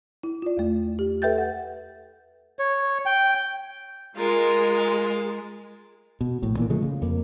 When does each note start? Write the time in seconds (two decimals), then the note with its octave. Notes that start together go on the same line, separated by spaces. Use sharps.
0.23 E4
0.42 F4 D5
0.57 E2 A3
0.99 G4
1.22 A4 B4 E5 G5 G6 A6
1.38 F#5
2.59 C#5
3.06 G5
4.17 G#3 F4 A#4
6.21 B2
6.42 A#1 A2
6.57 A#2 E3 A#3
6.70 C#3 F3 G#3 A3
6.82 C#3
7.02 F2 A#3